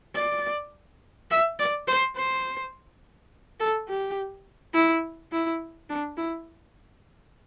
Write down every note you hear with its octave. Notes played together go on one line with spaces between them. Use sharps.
D5
E5
D5
C5
C5
A4
G4
E4
E4
D4
E4